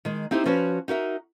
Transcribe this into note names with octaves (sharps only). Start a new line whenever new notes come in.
D#3 G#3
C4 D#4 E4 G4 C5
F3 C#4 F#4 B4 C#5
D#4 F#4 A#4 E5